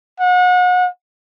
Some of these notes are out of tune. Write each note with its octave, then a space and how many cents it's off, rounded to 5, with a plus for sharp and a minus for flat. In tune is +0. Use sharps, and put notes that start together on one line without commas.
F#5 -35